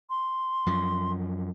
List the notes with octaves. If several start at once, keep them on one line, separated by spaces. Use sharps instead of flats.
C6
F#2 F3